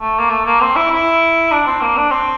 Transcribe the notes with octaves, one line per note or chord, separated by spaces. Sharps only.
A3
A#3
A3
A#3
C4
E4
E4
D4
C4
A#3
D4
C4